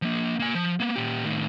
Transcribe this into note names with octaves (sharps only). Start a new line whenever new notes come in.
F3 A#3
A#3 G#5
F3
A#3 B3
A#2 G4
A2 D#3